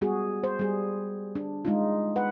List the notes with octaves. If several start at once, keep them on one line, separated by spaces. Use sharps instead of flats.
G3 B3 F#4 G#4
C5
G3 G#4
D4
G#3 D#4 F4
B4 F#5